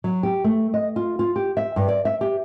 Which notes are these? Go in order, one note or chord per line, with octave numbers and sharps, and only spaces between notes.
F#3
G4
A3
D#5
F4
F4
G4
E5
G2
D5
E5
G4